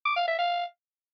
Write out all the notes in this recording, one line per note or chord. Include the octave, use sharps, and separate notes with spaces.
D6
F5
E5
F5